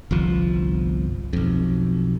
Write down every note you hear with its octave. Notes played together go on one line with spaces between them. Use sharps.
G1 C2 F3
B1 F2